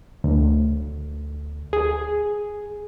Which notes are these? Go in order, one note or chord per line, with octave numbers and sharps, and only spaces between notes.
D2
G#4